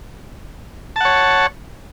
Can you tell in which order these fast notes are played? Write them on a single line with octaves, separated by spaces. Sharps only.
A5 F#5 C#5